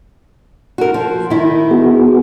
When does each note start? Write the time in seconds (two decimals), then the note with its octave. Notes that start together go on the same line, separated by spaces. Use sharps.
0.78 F#4 A#4
0.94 F3
1.30 D#3 E4
1.71 B3 F#4 G#4